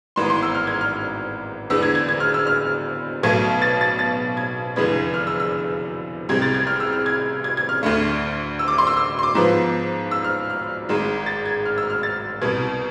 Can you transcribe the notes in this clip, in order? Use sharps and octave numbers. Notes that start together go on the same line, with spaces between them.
G#1 G#2 E3 B3 C6
C6
E6
F6
G#6
F6
E2 D3 G#3 B3 E6
G#6
G#6
G#6
F6
E6
F6
B1 B2 A3 G#6
A6
A6
A6
G#6
F1 E2 D3 G#3 B3 G#6
F6
E6
E6
C2 C3 G#3 C4 G#6
A6
G#6
F6
E6
F6
G#6
G#6
G#6
F6
D2 D3 A3
E6
D6
C6
E6
E6
C6
D6
G#2 F3 B3
E6
F6
F6
G#1 G#2 G#3
A6
G#6
F6
E6
F6
A6
C2 B2 B3 G#6